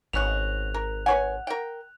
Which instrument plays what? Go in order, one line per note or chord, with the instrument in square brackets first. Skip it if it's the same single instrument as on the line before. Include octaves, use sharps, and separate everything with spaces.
[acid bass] G#1 [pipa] B3 C#4 F#4 [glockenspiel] F#6 F7
[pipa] A#4
[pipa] B4 C#5 G#5 [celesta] F#5
[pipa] A#4 G5